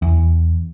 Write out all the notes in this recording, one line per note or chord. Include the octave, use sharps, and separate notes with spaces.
E2